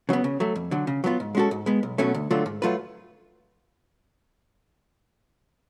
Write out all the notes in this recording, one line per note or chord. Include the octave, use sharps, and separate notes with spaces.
C#3 F#3 B3
C#3
F#3 A3
F2
D3 F#3
C#3
F#3 B3 F4
G#2
G#3 C#4 F#4 A4
G#2
G#3 B3
B1
B2 F#3 A3 C#4
D2
D3 F#3 A3 F4
G#2
F#3 A3 F4 B4